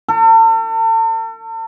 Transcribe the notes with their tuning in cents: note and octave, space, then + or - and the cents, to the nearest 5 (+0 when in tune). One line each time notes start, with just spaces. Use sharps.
A4 +40